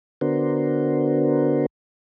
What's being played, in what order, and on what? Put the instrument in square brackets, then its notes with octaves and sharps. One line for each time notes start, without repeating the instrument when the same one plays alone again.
[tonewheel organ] D3 B3 D4 F#4 A#4 C5